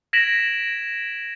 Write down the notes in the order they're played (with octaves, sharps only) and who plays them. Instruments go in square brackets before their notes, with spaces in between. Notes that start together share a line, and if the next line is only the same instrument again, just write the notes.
[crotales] G#6 A#6 B6 D7 E7 F#7